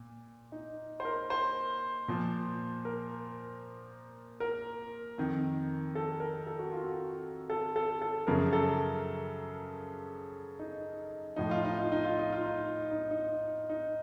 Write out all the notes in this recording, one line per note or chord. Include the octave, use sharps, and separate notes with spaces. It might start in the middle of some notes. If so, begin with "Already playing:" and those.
Already playing: A#2
D#4
C5
A#4
C5
A#2 F3
A#4
A#4
F2 D#3
A4
A#4
A4
F#4
F4
F#4
A4
A4
A4
F#2 C#3 F3 A#4
A4
D#4
A2 F3 D#4
F4
D#4
F4
D#4
F4
D#4
F4
D#4
D#4
D#4
D#4